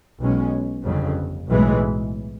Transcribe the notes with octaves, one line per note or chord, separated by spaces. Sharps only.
B1 B2 G#3 C#4
G1 F2 C#3
B1 A2 E3 G#3